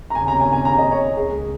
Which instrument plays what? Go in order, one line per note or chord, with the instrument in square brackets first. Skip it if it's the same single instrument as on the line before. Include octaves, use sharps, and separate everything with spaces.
[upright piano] A#5
[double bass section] D#2 C#3 A#3 C#4 [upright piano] G#5
[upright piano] A#5
G#5
G#5
A#5
D#5
C#5
[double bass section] C#2 C#3 A#3 [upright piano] G#4